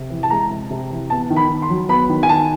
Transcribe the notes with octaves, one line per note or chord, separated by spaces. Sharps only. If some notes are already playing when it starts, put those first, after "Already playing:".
Already playing: C3
E3
A5
G#3 A#5
C3
C3
E3
B3 A5
D#3
B5
D#3
C6
F#3
B3 B5
D#3
G#5
D#3 A5